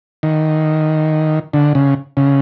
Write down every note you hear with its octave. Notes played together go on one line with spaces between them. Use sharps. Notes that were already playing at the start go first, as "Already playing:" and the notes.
D#3
D3
C#3
C#3